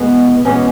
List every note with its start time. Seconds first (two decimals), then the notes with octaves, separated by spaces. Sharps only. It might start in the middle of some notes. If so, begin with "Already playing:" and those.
Already playing: E2 B2 G#3 B3
0.45 E2 B2 G#3 B3 C#4